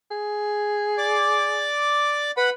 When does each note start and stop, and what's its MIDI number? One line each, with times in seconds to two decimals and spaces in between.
0.11 1.67 68
0.98 2.31 74
0.98 2.31 86
2.37 2.51 71
2.37 2.50 78
2.37 2.50 83